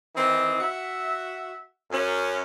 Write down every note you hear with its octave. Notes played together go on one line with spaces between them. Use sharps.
D#3 E3 C4 D#4
F#4 E5
F#2 C#4